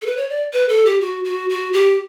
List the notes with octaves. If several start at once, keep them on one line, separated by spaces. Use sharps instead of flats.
A4
B4
C#5
D5
B4
A4
G4
F#4
F#4
F#4
G4